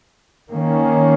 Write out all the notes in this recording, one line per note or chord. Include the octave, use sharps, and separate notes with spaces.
D#3 A#3 C#4